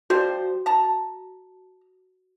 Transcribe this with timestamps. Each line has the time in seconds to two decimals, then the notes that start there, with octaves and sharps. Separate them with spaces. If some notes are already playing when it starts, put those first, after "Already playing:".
0.10 F3 G3 F#4 C5
0.66 A5 A#5